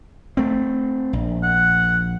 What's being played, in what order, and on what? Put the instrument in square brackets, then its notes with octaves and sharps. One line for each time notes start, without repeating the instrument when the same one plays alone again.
[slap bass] A3 C4
A#1
[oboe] F#5